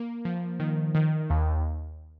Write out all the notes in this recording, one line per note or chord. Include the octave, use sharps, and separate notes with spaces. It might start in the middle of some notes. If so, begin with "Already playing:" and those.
Already playing: A#3
F3
D#3
D#3
D#2